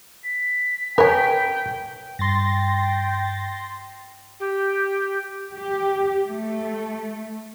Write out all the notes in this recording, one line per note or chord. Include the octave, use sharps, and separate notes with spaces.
B6
A#4 B4 C#5 G5 G#5
G2 G5 C6 A6 A#6
G4
G4
A3